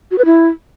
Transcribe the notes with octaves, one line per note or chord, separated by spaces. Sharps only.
F#4
B4
E4